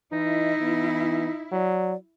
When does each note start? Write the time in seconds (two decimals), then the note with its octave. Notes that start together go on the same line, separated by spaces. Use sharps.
0.12 E3 D#4 E4 D#5
0.61 E3 B3
1.52 F#3 D5